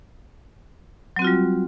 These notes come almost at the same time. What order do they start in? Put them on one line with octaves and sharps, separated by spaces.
F#3 C4 F#4 F4 G3